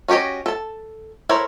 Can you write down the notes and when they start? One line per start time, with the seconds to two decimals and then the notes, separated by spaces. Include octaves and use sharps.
0.08 C#4 F#4 G4 C#5 D#5
0.46 A4 A5
1.29 E4 A4 A#4 C5 C#5